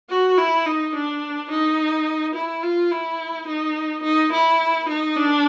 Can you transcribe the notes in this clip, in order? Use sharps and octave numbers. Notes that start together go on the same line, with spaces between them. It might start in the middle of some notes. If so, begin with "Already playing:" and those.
F#4
E4
D#4
D4
D#4
E4
F4
E4
D#4
D#4
E4
D#4
D4